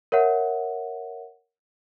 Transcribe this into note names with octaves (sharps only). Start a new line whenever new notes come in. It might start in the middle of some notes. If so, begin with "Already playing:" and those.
A#4 C#5 E5 F#5